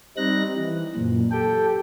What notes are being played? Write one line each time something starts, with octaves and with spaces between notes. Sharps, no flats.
G3 C4 D#4 F#6 A#6
E3
F#2 A#2
G4 A4 G5